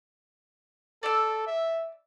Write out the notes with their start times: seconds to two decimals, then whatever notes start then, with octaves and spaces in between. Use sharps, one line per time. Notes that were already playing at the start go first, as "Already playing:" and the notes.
1.03 A4 D5 E6
1.47 E5